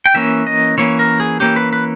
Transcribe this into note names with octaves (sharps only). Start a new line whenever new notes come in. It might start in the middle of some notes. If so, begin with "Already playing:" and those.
G5
E3 A#3 C#4 E5
D#5
E3 A#3 C#4 C#5
A#4
G#4
E3 A#3 C#4 G4
B4
B4